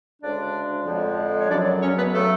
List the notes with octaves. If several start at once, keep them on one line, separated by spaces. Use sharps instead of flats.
D2 C#3 G#3 D4 D5
F2 D3 F3 G#3
C#5
F#2 C#3 F#3 D4 D5
C#4 C#5
B3 B4
C#3 F#3 A3 A4